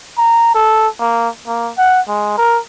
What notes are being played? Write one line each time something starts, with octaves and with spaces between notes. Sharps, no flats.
A#5
A4
A#3
A#3
F#5
G#3
A#4